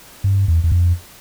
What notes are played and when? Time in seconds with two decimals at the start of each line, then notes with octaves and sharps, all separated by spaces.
0.24 G2
0.48 E2
0.64 E2
0.72 F2